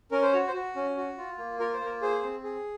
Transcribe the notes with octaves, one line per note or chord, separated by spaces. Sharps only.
C#4 A#4
C5
F#4 C#5
C5
F#4
C#4
F#4
F4
A#3
F4 A#4
C5
A#3 A#4
G#4 C5
C4
G#4